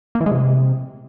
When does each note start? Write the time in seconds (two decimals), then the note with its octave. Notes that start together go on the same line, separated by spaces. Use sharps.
0.15 A#3
0.21 E3
0.26 G#3
0.32 C3